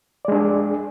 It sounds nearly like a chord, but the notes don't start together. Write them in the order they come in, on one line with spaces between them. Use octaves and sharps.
D5 G#3 D4 G#4